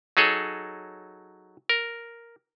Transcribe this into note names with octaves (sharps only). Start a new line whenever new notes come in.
F#3 D#4 G#4 A4 C#5
A#4